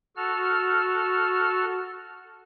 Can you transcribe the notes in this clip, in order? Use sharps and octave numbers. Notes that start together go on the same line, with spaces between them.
F#4 A4 F6